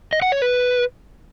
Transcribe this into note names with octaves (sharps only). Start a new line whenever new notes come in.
D#5
F#5
C#5
B4